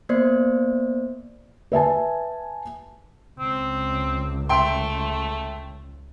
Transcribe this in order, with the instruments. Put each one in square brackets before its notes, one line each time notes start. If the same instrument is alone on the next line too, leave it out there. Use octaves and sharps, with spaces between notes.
[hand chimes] A#3 B3 C5 D5
[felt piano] B4 E5 G#5 A5
[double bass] C#2 [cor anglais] C4
[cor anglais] A3 [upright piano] E5 G5 C6